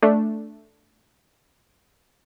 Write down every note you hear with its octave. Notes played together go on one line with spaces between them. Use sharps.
A3 D4